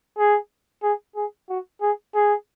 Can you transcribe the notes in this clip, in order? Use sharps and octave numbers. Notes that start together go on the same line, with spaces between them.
G#4
G#4
G#4
F#4
G#4
G#4